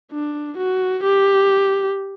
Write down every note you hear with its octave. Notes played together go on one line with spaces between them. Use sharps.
D4
F#4
G4